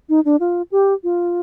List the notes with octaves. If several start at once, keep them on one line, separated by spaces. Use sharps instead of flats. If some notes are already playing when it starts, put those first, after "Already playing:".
D#4
D4
F4
G4
F4